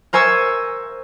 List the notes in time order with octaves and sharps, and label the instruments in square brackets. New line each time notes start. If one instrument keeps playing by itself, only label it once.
[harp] A#4 C5 G#5 C#6 E6